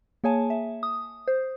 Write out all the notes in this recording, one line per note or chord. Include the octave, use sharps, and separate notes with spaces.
A#3 G#4 C#5 G#5 A5
E5
D#6
C5